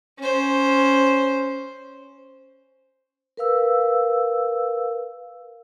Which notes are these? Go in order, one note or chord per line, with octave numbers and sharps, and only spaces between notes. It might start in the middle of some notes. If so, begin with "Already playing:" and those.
C#4 C5
A#4 B4 F5 E6